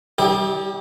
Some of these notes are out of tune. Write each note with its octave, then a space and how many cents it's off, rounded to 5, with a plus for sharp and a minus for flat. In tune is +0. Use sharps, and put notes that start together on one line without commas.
G3 -25 E4 -45 G4 +25